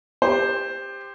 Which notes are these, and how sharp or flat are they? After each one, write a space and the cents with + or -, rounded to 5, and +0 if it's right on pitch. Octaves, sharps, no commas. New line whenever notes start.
G4 +20 C5 +0